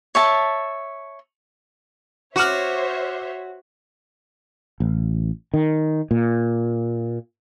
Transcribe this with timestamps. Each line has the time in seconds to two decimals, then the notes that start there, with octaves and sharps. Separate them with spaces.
0.15 C#5 E5 A5
2.36 F#4 C5 C#5 E5 F#5 D6 F6
4.80 A1
5.54 D#3
6.11 A#2